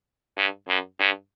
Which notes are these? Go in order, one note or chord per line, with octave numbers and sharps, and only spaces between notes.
G2
F#2
G2